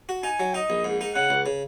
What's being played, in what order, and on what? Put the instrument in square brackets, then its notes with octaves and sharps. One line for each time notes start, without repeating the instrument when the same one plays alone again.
[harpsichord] F#4
[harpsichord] D#4 [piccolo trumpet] G#5
[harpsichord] F#3
[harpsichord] D#4 [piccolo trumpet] D#5
[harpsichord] A#1
G#2
D#4
[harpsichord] C#3 [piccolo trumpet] F#5
[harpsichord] C#2
C#3